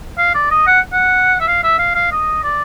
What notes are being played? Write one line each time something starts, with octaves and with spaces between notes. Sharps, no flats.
F5
D5
D#5
F#5
F#5
E5
F5
E5
F5
F5
D#5
D5